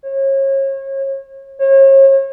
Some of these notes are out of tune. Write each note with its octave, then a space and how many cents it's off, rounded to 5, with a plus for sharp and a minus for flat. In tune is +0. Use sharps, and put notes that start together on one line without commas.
C#5 -35
C#5 -40